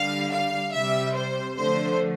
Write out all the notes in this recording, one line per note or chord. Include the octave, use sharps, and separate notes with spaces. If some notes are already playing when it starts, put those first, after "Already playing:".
Already playing: D3 G3 F5
F5
C3 G3 E5
C5
D3 F3 A3 C5